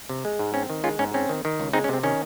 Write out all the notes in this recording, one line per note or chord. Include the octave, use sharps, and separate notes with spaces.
C3
G#3
G#2
C4 C#4
D#3
G#3 C#4 F4
G#2 C#4
C4 C#4
D#3
D#3
C#2
G#3 C4 D#4
C#4
C3 C4
D#3 C#4